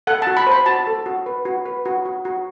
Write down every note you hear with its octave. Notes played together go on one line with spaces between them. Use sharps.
A4 F#5
F#4 A5
B5
C5 B5
F#4 A5
A4
F#4
B4
F#4
B4
F#4
F#4
F#4